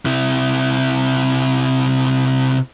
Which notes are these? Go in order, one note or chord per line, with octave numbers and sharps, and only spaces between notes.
C3 E4